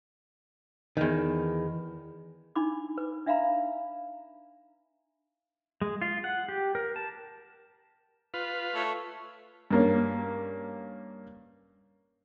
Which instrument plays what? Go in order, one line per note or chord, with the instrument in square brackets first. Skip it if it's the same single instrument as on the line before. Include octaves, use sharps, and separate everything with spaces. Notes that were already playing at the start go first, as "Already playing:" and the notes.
[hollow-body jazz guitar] E2 D#3
[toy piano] D4 D#4 B5 D6
B4
D4 E5 F5 A#5 B5
[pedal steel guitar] G#3
F4
F#5
G4
A#4
A5
[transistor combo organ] F4 B4
[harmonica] A3 C#5
[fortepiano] G2 A#3 C#4